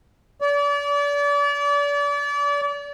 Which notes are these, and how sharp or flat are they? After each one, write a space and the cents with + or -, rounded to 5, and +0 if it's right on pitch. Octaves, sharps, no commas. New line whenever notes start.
D5 -35